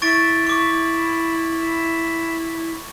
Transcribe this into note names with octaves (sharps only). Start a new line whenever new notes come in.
E4 C#6 A6 D7
C#6 D6